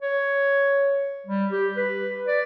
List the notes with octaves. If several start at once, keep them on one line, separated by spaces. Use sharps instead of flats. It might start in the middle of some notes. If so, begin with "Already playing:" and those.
C#5
G3
G4
B4
D5